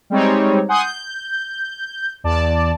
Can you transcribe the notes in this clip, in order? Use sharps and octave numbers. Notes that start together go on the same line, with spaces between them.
G3 G#3 C4 D#4 C#5
F#5 G#5 C6 D#6 G6
G6
E2 D5 A5